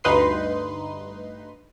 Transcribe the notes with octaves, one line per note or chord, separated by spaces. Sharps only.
D2 G2 D#4 B4 C6 C7